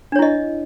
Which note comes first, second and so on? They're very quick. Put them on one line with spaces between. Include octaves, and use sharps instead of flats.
D4 C#5 E4 D#5